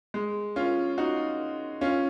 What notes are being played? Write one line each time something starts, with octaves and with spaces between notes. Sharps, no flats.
G#3
C#4 F4
D#4 F#4
C#4 F4